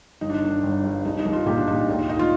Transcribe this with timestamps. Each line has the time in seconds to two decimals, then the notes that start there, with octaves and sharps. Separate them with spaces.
0.21 G1 D#4
0.30 D4
0.42 D#3 D4
0.63 G1
0.84 G2
1.05 C2 D#4
1.19 D#4
1.25 C2
1.33 F4
1.46 A#2 G4
1.58 D4
1.67 A#2 D#4
1.89 D2
1.99 D#4
2.09 D#3 D#4
2.19 F4